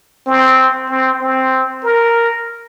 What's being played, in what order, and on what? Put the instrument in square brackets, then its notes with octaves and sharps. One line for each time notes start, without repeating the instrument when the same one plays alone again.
[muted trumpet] C4
C4
C4
A#4